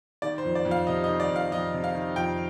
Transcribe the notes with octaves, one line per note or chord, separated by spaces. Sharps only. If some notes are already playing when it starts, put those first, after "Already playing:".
D#3 D5
C5
F2
D5
F2
F5
C3 D#5
D#5
D#3
D5
F2
F5
F2 D#5
C3
F5
D#3
F2 G5